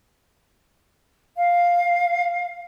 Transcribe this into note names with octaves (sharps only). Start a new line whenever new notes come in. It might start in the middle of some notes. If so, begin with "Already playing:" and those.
F5